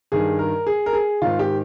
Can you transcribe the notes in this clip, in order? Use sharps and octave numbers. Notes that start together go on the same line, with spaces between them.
G2 D#3 G#4
A#4
G#4
A#4
G#4
G#2 D#3 F4
G4